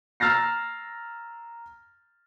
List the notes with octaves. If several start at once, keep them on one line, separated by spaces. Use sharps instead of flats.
A#5 E6 F6 A6 A#6 C7